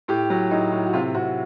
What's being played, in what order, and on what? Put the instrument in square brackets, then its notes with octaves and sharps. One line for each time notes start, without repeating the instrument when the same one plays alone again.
[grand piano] A2 G4
F#3
A2 D#4
A2
F#4
C3 F4
C3 F#4